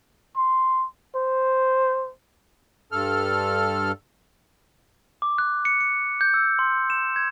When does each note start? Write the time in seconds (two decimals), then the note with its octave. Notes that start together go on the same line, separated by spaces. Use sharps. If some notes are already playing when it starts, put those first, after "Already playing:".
0.36 C6
1.15 C5
2.92 G2 A4 F6
5.22 D6
5.38 F#6
5.65 C#7
5.80 C#7
6.21 G6
6.34 E6
6.59 C6
6.90 E7
7.16 G#6